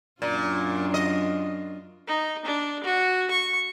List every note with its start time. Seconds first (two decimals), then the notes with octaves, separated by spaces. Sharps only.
0.22 F#2 A#2 D4 F4
0.94 D#5
2.07 D#4
2.45 D4
2.84 F#4
3.31 C#6